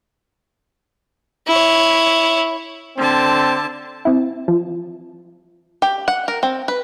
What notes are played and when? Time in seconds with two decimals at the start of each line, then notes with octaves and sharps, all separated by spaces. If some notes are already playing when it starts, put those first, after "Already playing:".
1.47 E4 C#5
2.98 D3 C4 A5
4.05 C4 E4
4.48 F3
5.82 G4
6.08 F#5
6.28 A#4
6.43 C4
6.68 B4